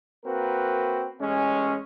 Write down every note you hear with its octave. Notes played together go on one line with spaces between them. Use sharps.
A#3 C4 F#4 A#4 B4
A1 G#3 C#4